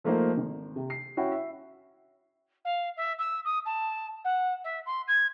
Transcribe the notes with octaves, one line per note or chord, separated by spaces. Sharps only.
F3 A3 A#3 D#4 A#4 C5
G#1
C3
C7
C#4 E4 F#4 G5
E5
F5
E5
E6
D#6
A5
F#5
E5
C6
G#6